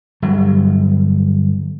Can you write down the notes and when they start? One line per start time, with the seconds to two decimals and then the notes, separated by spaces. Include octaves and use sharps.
0.22 G1 F#3